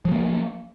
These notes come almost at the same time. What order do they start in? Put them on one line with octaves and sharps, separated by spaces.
F3 F#3 A#3